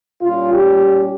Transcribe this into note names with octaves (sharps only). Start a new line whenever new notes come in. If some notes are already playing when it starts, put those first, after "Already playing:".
A#2 G3 C#4 F4
G4